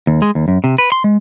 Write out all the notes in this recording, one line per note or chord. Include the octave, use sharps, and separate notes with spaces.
D#2
G#3
D#2
F#2
C3
B4
C6
G#3